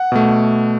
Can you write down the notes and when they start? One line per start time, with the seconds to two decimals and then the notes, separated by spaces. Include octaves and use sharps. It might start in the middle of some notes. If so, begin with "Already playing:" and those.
Already playing: F#5
0.12 B2 A3